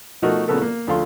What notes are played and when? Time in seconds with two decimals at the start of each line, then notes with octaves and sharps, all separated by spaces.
0.22 B2 F3 A3 D#4 F#4 A#4
0.48 A#2 C#3 A3 B3 A4 A#4
0.62 A#3
0.87 D2 F3 A3 F5 C6